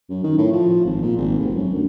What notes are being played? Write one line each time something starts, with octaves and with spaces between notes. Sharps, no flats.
F#2
D#3
A2
F3
G#1
A#2
G#1
F1
F#2
D2